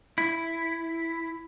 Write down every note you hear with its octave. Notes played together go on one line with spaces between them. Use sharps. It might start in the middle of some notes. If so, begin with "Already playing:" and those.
E4